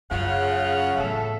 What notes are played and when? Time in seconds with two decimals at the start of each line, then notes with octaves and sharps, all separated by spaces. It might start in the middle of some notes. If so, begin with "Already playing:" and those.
0.11 F#2 C#3 F4 F#5
0.97 E2 A2 A4 E5